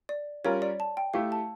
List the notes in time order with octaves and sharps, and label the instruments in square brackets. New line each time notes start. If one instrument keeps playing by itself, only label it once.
[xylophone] D5
[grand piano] G3 C#4 F4 A#4 [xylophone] C#5
[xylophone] D5
A5
G5
[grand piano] A3 E4 G4 [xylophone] F5
[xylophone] A5